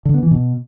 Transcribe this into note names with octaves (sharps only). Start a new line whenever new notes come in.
D3
B3
E3
B2